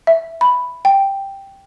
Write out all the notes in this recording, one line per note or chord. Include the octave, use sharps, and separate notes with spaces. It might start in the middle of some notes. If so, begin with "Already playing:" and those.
E5
B5
G5